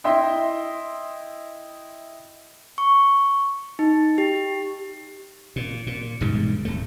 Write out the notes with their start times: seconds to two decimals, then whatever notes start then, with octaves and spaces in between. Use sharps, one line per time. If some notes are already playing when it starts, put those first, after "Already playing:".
0.04 E4 D#5 E5 G5 C6
2.78 C#6
3.79 D#4
4.18 G4
5.56 A#2
5.87 A#2
6.21 E1 G#2 D3 G3
6.65 D1 A3